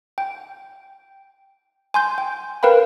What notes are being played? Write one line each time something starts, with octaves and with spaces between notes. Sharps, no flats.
G5
G#5 C6 G6
G5
A#4 B4 F5 G5 B5